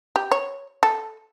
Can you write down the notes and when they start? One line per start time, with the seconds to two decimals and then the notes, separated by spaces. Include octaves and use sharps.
0.16 G4
0.32 C#5
0.83 A4